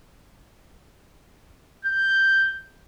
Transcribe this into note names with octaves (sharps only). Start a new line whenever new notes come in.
G6